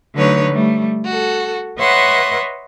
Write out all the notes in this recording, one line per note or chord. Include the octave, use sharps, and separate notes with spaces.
D3 F#3 A3 D#4 B4 C#5
G3 A3
F#4 A4
B4 C#5 D#5 E5 F#5 C6